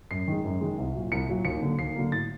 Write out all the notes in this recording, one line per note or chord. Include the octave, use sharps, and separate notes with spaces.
F#2 C7
D#3 G#3
F#2
D#3 G#3
C2
A#2 F#3
C2 C#7
A#2 F#3
D#2 C#7
D3 F#3 A#3
D#2 C7
D3 F#3 A#3
A2 A6